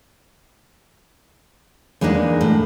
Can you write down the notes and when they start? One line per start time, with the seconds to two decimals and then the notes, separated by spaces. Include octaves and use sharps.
2.01 E2 G#3 A#3 D4 D#4
2.41 A2